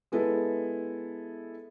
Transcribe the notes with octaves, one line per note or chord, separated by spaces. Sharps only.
G#3 B3 E4 A4